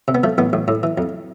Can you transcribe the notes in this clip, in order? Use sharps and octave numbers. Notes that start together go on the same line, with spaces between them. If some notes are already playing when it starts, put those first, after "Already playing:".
C3
B3
F3 A3
A1 B3
A1
A2
E3
F2